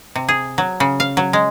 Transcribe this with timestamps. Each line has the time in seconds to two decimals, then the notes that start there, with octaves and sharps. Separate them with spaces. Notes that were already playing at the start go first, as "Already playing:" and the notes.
0.16 C3
0.28 G#4
0.58 F#3
0.80 C#3
1.00 F5
1.17 F#3
1.33 G#3